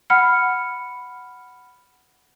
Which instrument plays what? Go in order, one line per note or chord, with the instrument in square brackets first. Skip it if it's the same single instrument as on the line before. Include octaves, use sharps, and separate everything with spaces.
[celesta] F#5 B5 F6 C#7